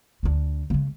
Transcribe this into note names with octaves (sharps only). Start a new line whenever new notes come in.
D2 D4
C#3 G#3